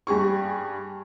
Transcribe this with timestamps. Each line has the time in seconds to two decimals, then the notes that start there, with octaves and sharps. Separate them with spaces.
0.07 G2 G4 G#4 C#6